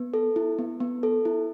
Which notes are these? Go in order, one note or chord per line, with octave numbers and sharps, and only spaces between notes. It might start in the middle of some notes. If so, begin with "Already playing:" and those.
Already playing: B3
A4
E4
B3
B3
A4
E4